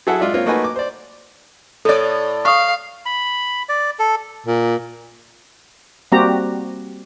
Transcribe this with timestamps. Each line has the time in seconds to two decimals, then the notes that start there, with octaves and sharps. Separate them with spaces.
0.07 F#3 E4 G#4 A4 E5 F#5
0.20 G#3 F4 D5 E5
0.34 A#3 C4 F4 C#5
0.46 A3 A#3 D#4 F#4 B4 G#5
0.64 D6
0.76 C5 D5
1.85 A2 A4 C#5 D5
2.45 F5 C#6 D#6
3.06 B5
3.69 D5
3.99 A4
4.46 A#2
6.12 G3 A#3 C4 F#4 G4 A#5